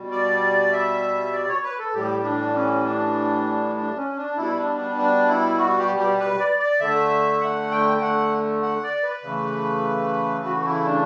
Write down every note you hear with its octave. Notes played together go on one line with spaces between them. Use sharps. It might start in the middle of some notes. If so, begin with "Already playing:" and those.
Already playing: B2 G3
D5
E5
D5
C#5
B4
A4
A2 E3 G3 G4
D4
C#4
D4
D4
C#4
D4
B2 G3 E4
D4
D4
D4
E4
F#4
G4
G4
B4
D5
D5
D3 A3 E5
F#5
G5
F#5
F#5
D5
B4
C#3 E3 A3
F#4
E4
D4